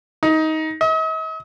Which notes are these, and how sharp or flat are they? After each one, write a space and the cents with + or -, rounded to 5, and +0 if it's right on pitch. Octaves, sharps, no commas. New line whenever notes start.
D#4 +20
D#5 +45